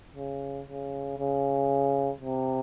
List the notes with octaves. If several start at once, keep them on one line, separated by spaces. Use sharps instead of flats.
C#3
C#3
C#3
C3